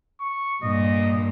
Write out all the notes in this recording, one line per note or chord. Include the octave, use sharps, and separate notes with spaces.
C#6
G2 A#2 D#5